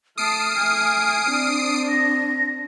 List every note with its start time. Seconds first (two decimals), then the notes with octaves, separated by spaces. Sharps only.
0.18 A3 A5 D#6 F6 C7 D7
0.57 A3 G#5
1.29 C4 D4
1.89 A#6